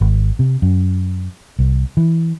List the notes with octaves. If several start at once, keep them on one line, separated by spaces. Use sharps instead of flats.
G#1
C3
F#2
C2
E3